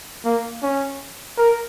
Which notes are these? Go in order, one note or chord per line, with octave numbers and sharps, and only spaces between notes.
A#3
C#4
A#4